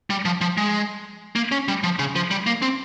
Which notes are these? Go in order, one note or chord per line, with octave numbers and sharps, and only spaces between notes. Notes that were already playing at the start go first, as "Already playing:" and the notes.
G3
F3
F3
G#3
A#3
C#4
G3
F3
C#3
F3
G3
A#3
C4